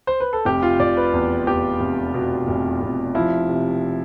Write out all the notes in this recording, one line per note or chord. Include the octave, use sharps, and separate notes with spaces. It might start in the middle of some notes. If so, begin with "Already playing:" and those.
C5
B4
A4
F1 G4
F4
F1 D5
B4
E2
E2 G4
F1
B2
F1
F1
F3 E4
C3